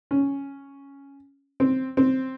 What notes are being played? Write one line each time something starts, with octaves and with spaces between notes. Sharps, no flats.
C#4
C4
C4